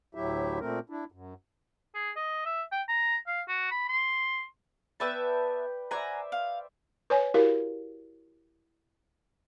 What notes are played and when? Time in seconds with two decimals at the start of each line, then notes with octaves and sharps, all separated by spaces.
0.15 D2 A2 F#3 E4 G4 E5
0.60 A#2 A3 C4 A#4
0.90 D4 E4
1.12 F#2
1.95 G#4
2.16 D#5
2.45 E5
2.72 G5
2.88 A#5
3.27 F5
3.48 F#4
3.71 B5
3.89 C6
5.00 B3 B4 D5 E5 G5 A5
5.91 C5 D5 E5 F#5 G#5 A#5
6.32 F5
7.10 B4 C#5 G#5
7.34 E4 F#4 G4 A#4 F5